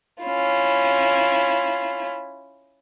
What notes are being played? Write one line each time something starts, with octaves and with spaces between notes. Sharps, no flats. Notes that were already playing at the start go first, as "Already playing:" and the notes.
C#4 E4 F4